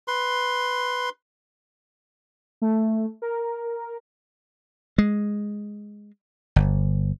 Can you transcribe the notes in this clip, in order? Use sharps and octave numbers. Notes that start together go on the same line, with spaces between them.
B4 C6
A3
A#4
G#3
G1